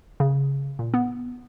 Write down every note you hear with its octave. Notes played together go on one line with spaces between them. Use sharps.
C#3
A#2
B3